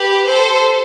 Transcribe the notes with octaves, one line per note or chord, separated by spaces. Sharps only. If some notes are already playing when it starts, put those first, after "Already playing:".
Already playing: G4 B4
A4 C5